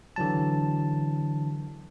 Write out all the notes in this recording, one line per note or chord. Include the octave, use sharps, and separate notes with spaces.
D3 E3 F#3 A5